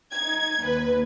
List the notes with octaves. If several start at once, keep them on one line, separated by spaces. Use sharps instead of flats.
D#4 G#6
D#2 B4